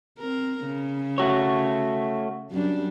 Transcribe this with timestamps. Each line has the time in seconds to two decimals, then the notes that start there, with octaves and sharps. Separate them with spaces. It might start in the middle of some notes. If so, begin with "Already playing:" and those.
0.19 C4 A#4
0.66 C#3
1.18 A3 F#4 C#5
2.51 F#2 G3 D4